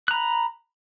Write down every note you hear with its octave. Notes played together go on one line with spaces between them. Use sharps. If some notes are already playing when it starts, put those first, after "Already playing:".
A#5 B5 F#6